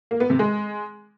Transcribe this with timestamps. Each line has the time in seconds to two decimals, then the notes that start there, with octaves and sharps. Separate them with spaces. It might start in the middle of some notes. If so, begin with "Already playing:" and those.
0.11 A#3
0.20 B3
0.30 C3
0.39 G#3